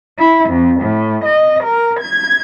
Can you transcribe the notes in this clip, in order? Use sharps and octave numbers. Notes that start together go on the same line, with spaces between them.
E4
F2
A2
D#5
A#4
G#6